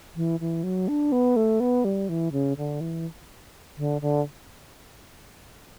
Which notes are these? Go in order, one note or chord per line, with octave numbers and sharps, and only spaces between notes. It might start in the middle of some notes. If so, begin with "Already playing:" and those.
E3
E3
F#3
D4
B3
A3
B3
G3
E3
C#3
D3
E3
D3
D3